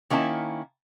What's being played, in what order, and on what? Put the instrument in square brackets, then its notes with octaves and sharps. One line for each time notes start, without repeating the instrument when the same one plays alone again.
[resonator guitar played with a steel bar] D#3 A#3 C#4 E4 A5